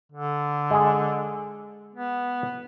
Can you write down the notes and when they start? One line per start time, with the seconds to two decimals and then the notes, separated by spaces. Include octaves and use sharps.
0.12 D3
0.71 G#3 G#4
1.95 B3